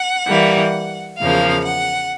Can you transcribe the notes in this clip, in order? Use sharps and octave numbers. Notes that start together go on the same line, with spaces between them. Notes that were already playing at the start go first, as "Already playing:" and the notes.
Already playing: F#5
E3 G3 A#3
E2 C#3 F3 A#3 F5
F#5